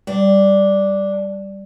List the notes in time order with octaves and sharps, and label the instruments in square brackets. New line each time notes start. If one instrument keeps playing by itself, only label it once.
[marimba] G3 [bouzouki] D4